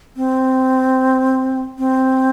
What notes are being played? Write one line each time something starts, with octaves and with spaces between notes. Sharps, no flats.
C4
C4